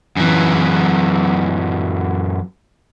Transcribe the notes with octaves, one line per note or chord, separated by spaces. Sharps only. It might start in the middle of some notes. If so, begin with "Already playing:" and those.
F#2 E3